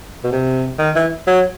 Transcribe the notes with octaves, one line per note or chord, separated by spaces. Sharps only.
B2
C3
D#3
E3
F#3